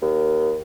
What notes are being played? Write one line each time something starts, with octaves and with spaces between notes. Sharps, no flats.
D#2